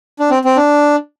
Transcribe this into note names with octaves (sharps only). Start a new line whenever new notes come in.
D4
C4
C4
D4